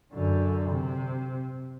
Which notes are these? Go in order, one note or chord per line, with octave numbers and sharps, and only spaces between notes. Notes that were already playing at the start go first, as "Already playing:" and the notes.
F#2 D3
C3